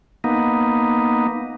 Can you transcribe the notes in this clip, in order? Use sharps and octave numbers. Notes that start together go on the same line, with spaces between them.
A#3 B3 D#4